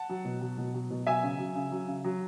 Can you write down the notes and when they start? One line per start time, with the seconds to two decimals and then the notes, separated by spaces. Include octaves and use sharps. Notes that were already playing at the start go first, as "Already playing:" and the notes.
Already playing: F#5 A5
0.09 F#3
0.25 B2
0.41 F#3
0.58 B2
0.74 F#3
0.90 B2
1.06 F#3 E5 G#5
1.23 C#3
1.39 F#3
1.55 C#3
1.72 F#3
1.88 C#3
2.04 F#3